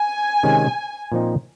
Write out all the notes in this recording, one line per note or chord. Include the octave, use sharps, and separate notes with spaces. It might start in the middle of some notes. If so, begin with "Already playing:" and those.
Already playing: G#5
C3 D#3 G#3 C#4
A#2 F3 C4 D#4